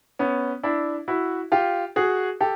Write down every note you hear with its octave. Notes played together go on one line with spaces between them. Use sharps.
B3 C#4
D4 E4
E4 F#4
F4 G4
F#4 G#4
G4 A4